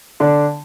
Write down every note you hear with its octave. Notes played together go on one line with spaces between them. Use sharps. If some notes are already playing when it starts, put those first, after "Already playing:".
D3 D4